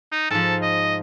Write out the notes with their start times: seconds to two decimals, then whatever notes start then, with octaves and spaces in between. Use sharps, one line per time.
0.12 D#4
0.30 G#2 F3 A4
0.62 D#5